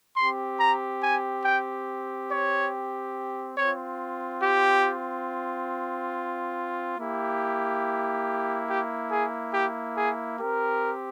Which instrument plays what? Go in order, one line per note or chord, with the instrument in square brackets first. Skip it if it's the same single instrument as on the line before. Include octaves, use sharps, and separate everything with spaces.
[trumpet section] C4 G4 C6
A#5
G#5
G5
C#5
C4 F4 C#5
G4
A#3 E4 G4
G4
G#4
G4
G#4
C4 G4 A#4